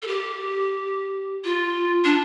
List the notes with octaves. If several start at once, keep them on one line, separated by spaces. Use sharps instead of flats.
A4
G4
F4
D4